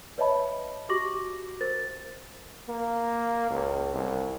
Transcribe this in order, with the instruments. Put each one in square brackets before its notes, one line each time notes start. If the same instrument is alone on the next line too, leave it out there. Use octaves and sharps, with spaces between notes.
[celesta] B4 C#5 D#5 E5 A5 B5
F#4 G4 C#6 D6 A#6 F#7
A#4 C5 A6
[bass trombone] A#3
C#2
C2